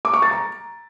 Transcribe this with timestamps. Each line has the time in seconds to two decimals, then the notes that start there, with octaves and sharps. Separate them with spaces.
0.05 D6
0.14 C#6
0.22 A6
0.31 A#5